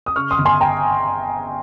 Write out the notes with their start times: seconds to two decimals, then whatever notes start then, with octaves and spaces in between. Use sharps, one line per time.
0.06 D#6
0.16 C#3 C#6 F6
0.31 C6 D#6
0.38 G1
0.45 G#5 C6
0.61 G5 A#5